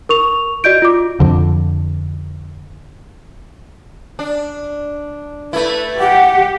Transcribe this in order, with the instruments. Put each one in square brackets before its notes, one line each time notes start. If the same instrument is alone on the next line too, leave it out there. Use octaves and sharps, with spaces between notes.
[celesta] A#4 C#6 F7
F#4 D5 D#5 G6 D7
F4 D6
[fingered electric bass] F2 D3
[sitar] D4
[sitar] A3 E4 [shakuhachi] B4
[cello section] G4 [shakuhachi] F#5